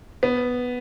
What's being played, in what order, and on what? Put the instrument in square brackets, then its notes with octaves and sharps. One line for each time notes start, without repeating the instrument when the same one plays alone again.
[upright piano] B3